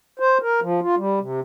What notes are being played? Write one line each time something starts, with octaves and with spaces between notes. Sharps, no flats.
C5
A#4
F3
F4
G3
C3